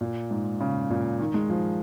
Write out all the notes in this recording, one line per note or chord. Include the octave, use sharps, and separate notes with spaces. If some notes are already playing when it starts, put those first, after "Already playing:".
A#2
G#2
C#3
A#2
D#3
G#3
F3